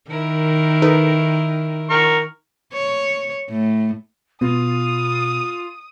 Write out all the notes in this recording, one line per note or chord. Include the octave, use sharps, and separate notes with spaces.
D#3 E4 A#4
D#4 A4 B4
A#4 C#6
C#5
A2
B2 B3 F4 D#6